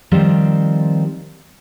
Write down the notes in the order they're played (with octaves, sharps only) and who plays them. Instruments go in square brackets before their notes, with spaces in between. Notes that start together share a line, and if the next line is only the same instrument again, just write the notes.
[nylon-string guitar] D#3 F3 G3 C4